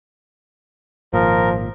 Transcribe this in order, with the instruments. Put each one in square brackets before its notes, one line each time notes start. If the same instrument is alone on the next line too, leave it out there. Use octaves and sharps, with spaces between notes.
[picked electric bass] G#1 A#2 [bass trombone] F3 [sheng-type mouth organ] A#4